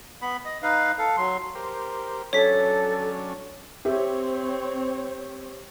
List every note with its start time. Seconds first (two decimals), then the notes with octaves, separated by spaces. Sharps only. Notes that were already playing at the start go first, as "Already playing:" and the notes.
0.22 B3 B5
0.45 D#5
0.63 D#4 B4 F5
0.98 A4 F5
1.17 F#3 C6
1.55 G4 A#4 C5
2.33 F#3 C#4 D4 A4 C#5 B6
3.85 C4 G4 C#5 E5